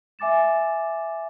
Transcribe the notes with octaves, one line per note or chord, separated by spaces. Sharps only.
E5 G#5 D6 A6 E7